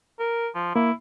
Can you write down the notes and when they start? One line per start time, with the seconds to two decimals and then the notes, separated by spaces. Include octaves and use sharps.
0.20 A#4
0.55 F3
0.76 A#3 E4